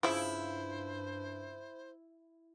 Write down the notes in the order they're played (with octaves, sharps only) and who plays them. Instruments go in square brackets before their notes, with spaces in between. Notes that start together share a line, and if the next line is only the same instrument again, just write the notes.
[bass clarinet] G2 [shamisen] C#3 F3 [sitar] E4 [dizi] C5